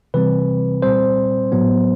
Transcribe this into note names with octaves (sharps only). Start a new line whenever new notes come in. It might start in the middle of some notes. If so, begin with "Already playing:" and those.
C3 E3 G3 C4 B4
A#2 G3 C4 C5
A2 F#3 B3